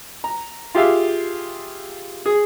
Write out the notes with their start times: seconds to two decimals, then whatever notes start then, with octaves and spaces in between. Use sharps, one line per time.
0.24 A#5
0.75 F4 G4 G#4 E5 F5
2.26 G#4